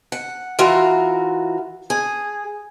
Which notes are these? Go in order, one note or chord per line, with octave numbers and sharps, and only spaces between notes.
F#5
E3 F4 F#4 A#4
G#4